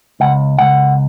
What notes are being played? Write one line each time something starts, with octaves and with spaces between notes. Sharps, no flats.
C#2 F#5
C#2 F#5